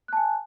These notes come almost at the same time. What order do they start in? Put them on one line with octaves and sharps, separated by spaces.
F#6 A5 G#5